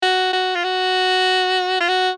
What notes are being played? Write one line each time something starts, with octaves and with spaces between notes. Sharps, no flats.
F#4
F#4
F4
F#4
F4
F#4